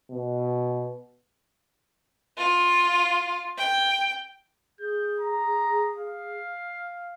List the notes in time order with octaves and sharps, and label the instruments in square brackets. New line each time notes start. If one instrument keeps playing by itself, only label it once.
[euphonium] B2
[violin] F4
G5
[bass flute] G#4 [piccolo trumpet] G6
[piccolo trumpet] A#5
F5